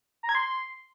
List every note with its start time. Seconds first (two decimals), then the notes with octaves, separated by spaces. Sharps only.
0.23 A#5
0.29 G#6
0.35 C6